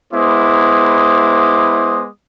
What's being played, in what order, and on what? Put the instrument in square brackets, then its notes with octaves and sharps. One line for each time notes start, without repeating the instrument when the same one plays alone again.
[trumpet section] G#3 B3 E4 C5 D6 D#6